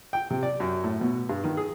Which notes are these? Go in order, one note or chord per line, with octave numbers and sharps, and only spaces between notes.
G5
C3
D5
F#2
A2
B2
G2
D#3
G#4